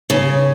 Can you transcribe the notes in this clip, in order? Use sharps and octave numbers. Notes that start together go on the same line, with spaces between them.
C#3